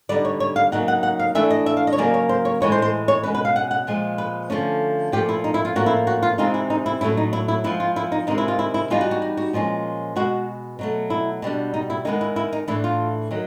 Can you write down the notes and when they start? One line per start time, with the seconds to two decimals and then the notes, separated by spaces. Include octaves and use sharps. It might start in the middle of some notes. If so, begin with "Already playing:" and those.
0.09 D3 G3 B3 D#4 D5
0.25 C#5
0.40 C#5
0.56 F5
0.72 C#3 F#3 A#3 D#4 F#5
0.88 F#5
1.03 F#5
1.19 F5
1.35 E3 A3 D4 E5
1.50 D#5
1.66 E5
1.77 F5
1.87 D#5
1.93 C#5
1.97 C#3 F#3 A#3 D#4 D5
2.14 C#5
2.29 C5
2.45 C#5
2.61 A2 E3 G#3 B3 C#5
2.72 C5
2.82 C5
3.08 C#5
3.23 B2 G#3 C#4 B4
3.34 B4
3.45 F5
3.56 F#5
3.71 F#5
3.87 A#2 F3 G#3
4.18 B4
4.50 D3 F3 A3 C#4
5.12 A#2 F3 A3 G4
5.29 E4
5.44 D#4
5.54 E4
5.65 F4
5.76 A2 F3 A#3 C#4 F#4
5.86 E4
6.07 F#4
6.22 F4
6.38 C3 E3 G#3 C4 D#4 F4
6.54 E4
6.70 D#4
6.86 E4
7.01 A2 F#3 A3 C#4 E4
7.17 D#4
7.33 E4
7.48 E4
7.64 F3 G#3 B3 E4
7.80 F4
7.96 E4
8.12 D#4
8.27 C3 D#3 G#3 D#4
8.38 E4
8.48 F4
8.59 E4
8.74 E4
8.90 E3 G3 B3 D#4 F4
9.01 F#4
9.11 F#4
9.22 F#4
9.37 F#4
9.53 A#2 F3 G#3 C#4
10.16 B2 G#3 B3 F#4
10.79 B2 F#3 A3
11.10 E4
11.42 B2 G3 B3 D4
11.74 D#4
11.90 E4
12.05 D#3 G#3 B3 D#4
12.21 E4
12.36 E4
12.53 D#4
12.68 A2 E3 A3 D4 E4
12.84 F4
13.31 D#3 F#3